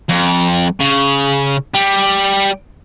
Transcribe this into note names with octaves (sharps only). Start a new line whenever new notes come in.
F2
C#3
G3